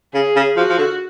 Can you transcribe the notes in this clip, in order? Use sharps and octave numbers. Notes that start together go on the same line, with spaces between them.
C#3 G#4
C#3
F3 F#4
F3
D3